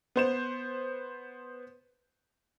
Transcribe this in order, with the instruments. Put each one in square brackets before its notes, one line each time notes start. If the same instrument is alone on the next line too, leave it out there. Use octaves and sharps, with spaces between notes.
[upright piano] B3 C5 E7